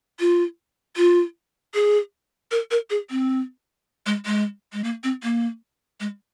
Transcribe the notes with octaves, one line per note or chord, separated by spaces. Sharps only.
F4
F4
G#4
A#4
A#4
G#4
C4
G#3
G#3
G#3
A#3
C4
A#3
G#3